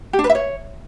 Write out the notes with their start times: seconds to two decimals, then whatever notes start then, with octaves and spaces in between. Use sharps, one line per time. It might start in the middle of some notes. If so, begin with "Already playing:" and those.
0.13 G4
0.19 D4
0.24 B4
0.29 E5
0.35 C#5